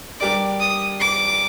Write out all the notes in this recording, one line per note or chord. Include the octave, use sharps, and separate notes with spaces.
G3 D4 G4 A#4 D5 D6
D#6
D6